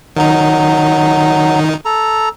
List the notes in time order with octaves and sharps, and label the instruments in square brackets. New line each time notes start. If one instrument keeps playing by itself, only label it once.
[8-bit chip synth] D#3 D#4 [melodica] F#3
[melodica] A4 A#5